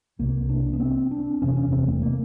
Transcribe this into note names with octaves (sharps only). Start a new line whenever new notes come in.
C2 C3 A#3
D4
B3
C4
D4
F#1 E2 C3 C#4
C#4
C4
A3
A#3